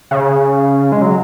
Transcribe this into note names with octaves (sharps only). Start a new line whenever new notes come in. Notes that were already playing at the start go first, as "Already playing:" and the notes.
C#3
G#3
F#3